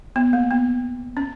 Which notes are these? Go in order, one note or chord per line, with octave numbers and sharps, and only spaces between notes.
B3
A#3
B3
C#4